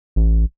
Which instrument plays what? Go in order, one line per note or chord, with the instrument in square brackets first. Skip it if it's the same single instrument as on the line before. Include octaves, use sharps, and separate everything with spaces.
[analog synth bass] A1